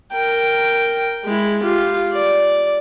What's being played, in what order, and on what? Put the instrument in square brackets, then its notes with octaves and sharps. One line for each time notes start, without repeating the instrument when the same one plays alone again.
[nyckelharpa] A#4 G5
G#3 E4
F4 G4
D5